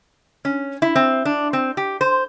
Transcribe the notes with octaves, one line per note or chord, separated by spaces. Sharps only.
C#4
E4
C4
D4
C4
G4
C5